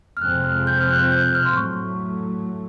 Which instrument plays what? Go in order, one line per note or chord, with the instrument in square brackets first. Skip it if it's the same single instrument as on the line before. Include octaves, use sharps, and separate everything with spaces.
[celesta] F6
[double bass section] F2 C3 F3 G#3 C4 [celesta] F#6
[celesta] F6
G6
F6
F#6
G6
F6
C6
[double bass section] A2 F#3 A3 [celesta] C#6